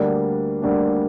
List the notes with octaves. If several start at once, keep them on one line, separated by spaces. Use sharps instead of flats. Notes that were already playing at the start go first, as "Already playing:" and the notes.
Already playing: D2 D3 G3 A#3 D4
D2 D3 G3 A#3 D4